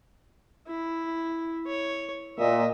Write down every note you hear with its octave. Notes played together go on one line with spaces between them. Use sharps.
E4
C#5
A#2 D#5 E5